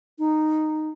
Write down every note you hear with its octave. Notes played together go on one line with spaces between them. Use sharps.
D#4